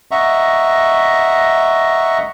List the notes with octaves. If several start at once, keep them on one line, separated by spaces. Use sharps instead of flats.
D#5 E5 F#5 A#5 C#6